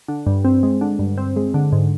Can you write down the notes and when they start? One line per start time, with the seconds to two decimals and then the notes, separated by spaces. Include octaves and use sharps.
0.08 D3
0.27 G2
0.44 C4
0.63 G#3
0.81 D3
0.99 G2
1.17 C4
1.36 G#3
1.54 D3
1.72 G#2